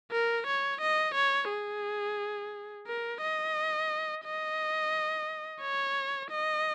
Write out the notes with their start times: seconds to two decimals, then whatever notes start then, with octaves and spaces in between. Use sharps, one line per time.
0.12 A#4
0.47 C#5
0.81 D#5
1.15 C#5
1.49 G#4
2.87 A#4
3.21 D#5
4.25 D#5
5.61 C#5
6.31 D#5